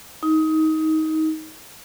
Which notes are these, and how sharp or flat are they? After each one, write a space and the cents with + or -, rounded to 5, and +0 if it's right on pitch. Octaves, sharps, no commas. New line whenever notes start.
D#4 +20